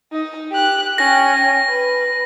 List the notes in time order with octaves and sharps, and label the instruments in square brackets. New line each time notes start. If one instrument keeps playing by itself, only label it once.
[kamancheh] D#4 D#5
G4 F#6
[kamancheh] C#4 G5 [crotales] A#6
[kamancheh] B4